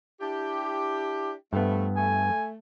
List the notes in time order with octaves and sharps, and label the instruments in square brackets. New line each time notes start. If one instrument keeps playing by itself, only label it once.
[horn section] D4 E4 G4
[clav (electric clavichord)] G2 B3 [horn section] F3 A3
[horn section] A3 [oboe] G#5